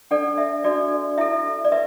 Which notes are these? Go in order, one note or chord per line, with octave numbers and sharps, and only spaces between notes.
D4 A4 D5 F#5
E5
D4 F#4 A4 D5
E4 A4 E5
D5
B4 E5